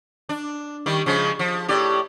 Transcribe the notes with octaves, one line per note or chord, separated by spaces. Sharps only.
D4
D#3 G3
C#3 F3 G#3
F3
A2 G4 D5